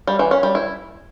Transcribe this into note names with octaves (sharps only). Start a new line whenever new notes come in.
G3
E3
C#4
G3
E4